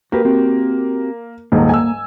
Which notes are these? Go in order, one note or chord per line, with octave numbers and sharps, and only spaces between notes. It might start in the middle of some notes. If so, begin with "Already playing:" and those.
A#3 F#4 G4 B4
C4 F#4 G4
D#1 G#2 A#3
G#5 E6